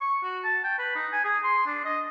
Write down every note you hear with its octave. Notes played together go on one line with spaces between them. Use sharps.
C#6
F#4
A5
G5
B4
D#4
G#5
G#4
C6
D4
D#5